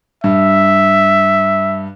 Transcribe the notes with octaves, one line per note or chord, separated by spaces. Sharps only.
G2 E5